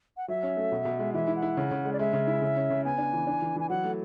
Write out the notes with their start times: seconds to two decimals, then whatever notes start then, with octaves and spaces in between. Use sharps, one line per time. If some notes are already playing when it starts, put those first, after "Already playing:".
0.17 F#5
0.28 F#3 E5
0.43 C#4
0.57 A3
0.72 B2
0.85 B2
0.99 G#3
1.14 E3 E5
1.28 E4
1.36 F#5
1.42 E4
1.57 C#3
1.71 C#3
1.85 G#3
1.93 D5
1.99 G#3 E5
2.13 C#3
2.27 E4
2.42 C#3
2.56 C#4
2.70 C#3
2.84 B3 G#5
2.98 D4
3.13 E3
3.27 D4
3.42 E3
3.56 E3 G#5
3.69 F#3 F#5
3.84 A3